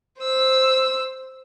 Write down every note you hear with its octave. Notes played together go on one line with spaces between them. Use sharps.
C5 E6